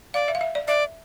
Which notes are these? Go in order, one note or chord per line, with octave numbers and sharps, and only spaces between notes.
D5 F5
E5
F5
E5
D5
D5 E5